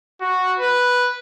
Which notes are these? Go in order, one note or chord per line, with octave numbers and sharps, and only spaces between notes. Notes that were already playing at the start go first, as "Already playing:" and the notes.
F#4
B4